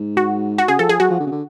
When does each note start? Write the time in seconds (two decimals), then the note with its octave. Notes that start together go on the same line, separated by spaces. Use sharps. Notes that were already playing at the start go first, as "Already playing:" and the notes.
Already playing: G#2
0.17 F#4
0.58 F#4
0.68 C#3 G#4
0.79 F3 A4
0.89 F3 G#4
1.00 F#3 F#4
1.10 F3
1.20 D3
1.27 C#3
1.31 D3